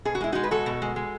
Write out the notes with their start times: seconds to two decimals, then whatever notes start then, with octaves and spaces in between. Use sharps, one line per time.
0.05 B2 G#4
0.15 F#4
0.21 G#3 E4
0.32 G#3 D#4 F#4
0.44 B4
0.51 B2 F#4 A4
0.66 B2
0.82 G#3
0.96 G#3